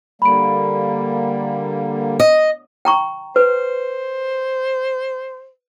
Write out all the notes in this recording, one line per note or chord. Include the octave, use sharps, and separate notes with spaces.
D3 G3 A#3 B5 D7
D#5
G5 A#5 C#6
B4 C5